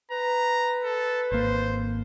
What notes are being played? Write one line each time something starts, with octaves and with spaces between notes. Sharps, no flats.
B4 A#5
A4
G#1 A#3 C5